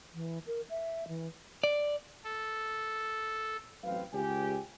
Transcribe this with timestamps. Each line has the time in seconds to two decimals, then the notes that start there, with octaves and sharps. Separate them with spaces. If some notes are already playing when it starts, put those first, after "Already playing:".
0.14 E3
0.47 A#4
0.70 E5
1.08 E3
1.64 D5
2.24 A4
3.83 A1 F#3 C4 B4 F5
4.13 C#2 G4 G#5